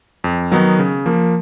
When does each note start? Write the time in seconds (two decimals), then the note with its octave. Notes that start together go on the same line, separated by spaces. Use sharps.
0.24 F2
0.51 D#3 F#3 B3 D#4
0.79 C#3
1.06 F3 A#3